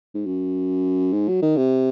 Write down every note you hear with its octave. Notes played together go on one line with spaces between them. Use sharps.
G#2
F#2
G#2
F#3
D#3
C3